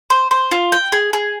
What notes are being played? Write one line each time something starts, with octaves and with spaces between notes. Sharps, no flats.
C5
C5
F4
G5
G#4
G#4